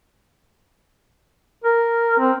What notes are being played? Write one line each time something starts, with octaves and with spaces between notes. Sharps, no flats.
A#4
C4